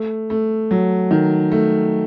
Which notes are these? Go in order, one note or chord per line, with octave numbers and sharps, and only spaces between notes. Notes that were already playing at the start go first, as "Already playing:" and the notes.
Already playing: A3
A3
F#3
D#3
A3